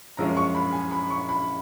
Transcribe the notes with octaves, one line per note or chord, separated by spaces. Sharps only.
F#2 F3 G#3 C#4 A#5
C#6
B5
G#5
B5
C#6
B5